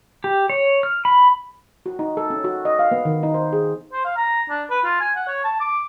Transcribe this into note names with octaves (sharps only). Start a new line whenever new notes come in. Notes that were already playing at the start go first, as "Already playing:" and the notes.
G4
C#5
F6
B5
F#4
D#4
A4
C#4
F#4
D#5
F5
B3
D#3
D#4
C5
G#4
C5
F5
A#5
D4
B4
F4
G#5
F#5
C#5
A5
D6